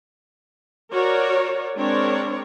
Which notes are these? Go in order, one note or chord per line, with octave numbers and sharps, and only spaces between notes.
F#4 A#4 C#5 D5
G#3 C4 D4 A#4 C#5